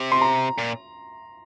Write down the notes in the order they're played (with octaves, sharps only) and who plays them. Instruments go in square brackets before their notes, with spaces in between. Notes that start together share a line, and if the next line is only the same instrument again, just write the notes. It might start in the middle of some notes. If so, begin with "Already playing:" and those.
Already playing: [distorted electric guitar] C3
[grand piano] C6
A#5
[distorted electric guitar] A#2